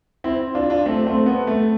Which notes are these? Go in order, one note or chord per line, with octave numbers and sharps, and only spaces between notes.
C4 E4
D4 F4
D4 F4
A3 C4
A3 C4
B3
A3